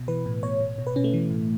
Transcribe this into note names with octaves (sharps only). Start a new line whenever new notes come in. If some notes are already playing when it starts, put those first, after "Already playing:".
Already playing: B2
E3 B4
A2
B2 C#5
B2
B2
B4
B2 C#4
A3
E3
A2